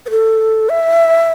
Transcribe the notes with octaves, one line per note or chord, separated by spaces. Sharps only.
B4
A4
E5